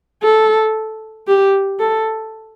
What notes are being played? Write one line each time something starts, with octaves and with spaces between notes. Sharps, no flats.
A4
G4
A4